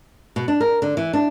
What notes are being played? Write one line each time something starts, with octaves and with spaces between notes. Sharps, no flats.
B2
D4
A#4
D3
E3
D4